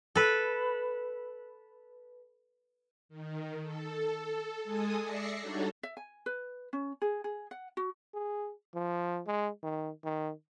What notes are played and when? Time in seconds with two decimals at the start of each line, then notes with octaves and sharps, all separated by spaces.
0.15 A4 B4
3.09 D#3
3.62 A4
4.64 G#3 A4 G#5 D#6
5.01 D5 E5 A#6 C7 C#7
5.40 G3 D4 D#4 F#4 A4 C#5
5.83 E5
5.97 G#5
6.26 B4
6.73 C#4
7.02 G#4
7.24 G#4
7.51 F#5
7.77 F#4
8.14 G#4
8.75 F3
9.27 G#3
9.63 D#3
10.04 D#3